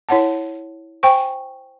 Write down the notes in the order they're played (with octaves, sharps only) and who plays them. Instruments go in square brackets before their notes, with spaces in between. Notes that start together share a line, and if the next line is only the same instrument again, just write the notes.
[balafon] E4 C#5 F#5 A5
C5 G5 G#5 C#6